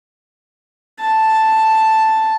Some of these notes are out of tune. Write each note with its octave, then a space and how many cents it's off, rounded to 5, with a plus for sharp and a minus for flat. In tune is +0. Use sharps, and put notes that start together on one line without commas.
A5 +0